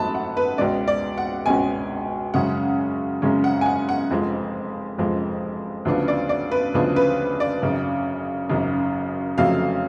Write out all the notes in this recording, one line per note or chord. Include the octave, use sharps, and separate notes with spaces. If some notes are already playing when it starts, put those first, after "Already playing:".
Already playing: G#1 G#2 F#3 A3 A5 B5
F#5
B4
C#2 B2 G#3 C#4 D5
D5
F#5
C#2 B2 G#3 C#4 G#5
F#2 C#3 G#3 C#4 F#5
F#2 C#3 G#3 C#4
F#5
G#5
F#5
F#5
F1 F2 F3 G#3
F1 F2 F3 G#3
D2 C#3 F3 B3 D4
D5
D5
B4
D2 C#3 F3 B3 D4 B4
B4
D5
G#1 F#2 C#3
G#1 F#2 C#3
F1 F2 C#3 F#3 A3 F5